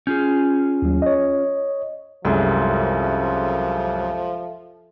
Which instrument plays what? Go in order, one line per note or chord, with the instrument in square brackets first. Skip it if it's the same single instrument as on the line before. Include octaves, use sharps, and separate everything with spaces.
[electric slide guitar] C#4 F4 G#4 [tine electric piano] G6
[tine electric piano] D#2 F#3
C#5 D#5
[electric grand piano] C2 F#2 G#3 [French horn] F3 [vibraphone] A4 E5